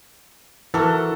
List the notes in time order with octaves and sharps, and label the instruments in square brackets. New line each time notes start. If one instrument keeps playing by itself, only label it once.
[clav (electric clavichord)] E3 [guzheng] F#4 A#4 [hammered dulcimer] A4